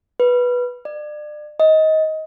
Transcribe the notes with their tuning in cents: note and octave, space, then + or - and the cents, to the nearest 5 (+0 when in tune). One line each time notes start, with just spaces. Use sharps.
B4 -10
D5 +35
D#5 +20